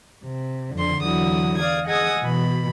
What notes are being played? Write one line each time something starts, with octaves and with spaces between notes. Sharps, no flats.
C3
F2 D3 C6
E2 D3 F#3 E4 F#4 D#6
D5 F5 D#6 G#6
G#4 D#5 F#5 G#5 D#6 E6
B2 E3 B5